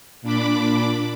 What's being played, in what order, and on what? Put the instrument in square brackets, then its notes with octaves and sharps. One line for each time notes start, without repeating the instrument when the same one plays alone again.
[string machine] A#2 D4 B5 D6